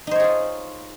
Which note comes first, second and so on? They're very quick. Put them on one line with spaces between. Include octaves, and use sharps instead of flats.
D#4 C5 C#5 G#4 F4